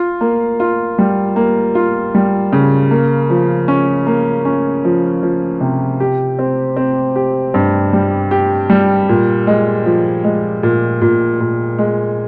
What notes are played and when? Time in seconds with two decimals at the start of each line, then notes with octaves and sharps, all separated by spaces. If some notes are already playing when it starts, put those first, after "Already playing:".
Already playing: F4
0.21 A#3
0.60 F4
0.98 G3
1.36 A#3
1.75 F4
2.15 G3
2.52 C#3
2.91 A#3
3.30 F3
3.68 C#4
4.07 A#3
4.45 C#4
4.85 F3
5.23 F3
5.61 C3
6.00 G4
6.39 C4
6.76 C4
7.16 G4
7.54 G2
7.93 G3
8.31 G4
8.70 G3
9.09 A#2
9.47 G#3
9.86 F3
10.24 G#3
10.63 A#2
11.01 A#2
11.40 A#2
11.79 G#3